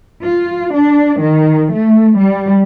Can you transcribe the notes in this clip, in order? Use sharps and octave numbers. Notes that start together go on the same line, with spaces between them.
F4
D4
D#3
A3
G3